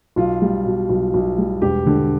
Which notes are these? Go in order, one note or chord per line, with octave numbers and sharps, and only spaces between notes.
B1 F4
G3
B2
B1
B1
G3
E1 G4
D3